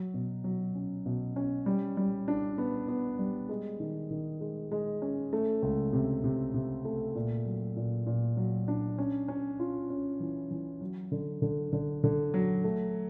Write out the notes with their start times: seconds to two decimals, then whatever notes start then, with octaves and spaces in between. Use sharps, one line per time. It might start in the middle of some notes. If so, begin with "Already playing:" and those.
Already playing: F#3
0.14 B2
0.44 F#3
0.75 C#4
1.06 B2
1.36 C#4
1.66 G3
1.97 G3
2.28 D4
2.58 B3
2.88 B3
3.19 G3
3.49 G#3
3.80 D#3
4.11 D#3
4.41 G#3
4.72 G#3
5.02 C#4
5.33 A3
5.63 C#2
5.93 C3
6.24 C3
6.54 C3
6.85 A3
7.15 A#2
7.45 F#3
7.76 A#2
8.07 A#2
8.37 F#3
8.68 D4
8.98 C#4
9.28 C#4
9.59 F4
9.90 C#4
10.20 E3
10.51 E3
10.81 F#3
11.12 D3
11.42 D3
11.73 D3
12.04 D3
12.34 F#3
12.64 A3